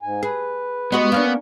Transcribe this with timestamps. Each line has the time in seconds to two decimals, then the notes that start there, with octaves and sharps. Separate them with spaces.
0.02 G#2 G#5
0.23 G#4 B4
0.92 G#3 B3 F#4 D#5
1.12 A#3 C#4 D4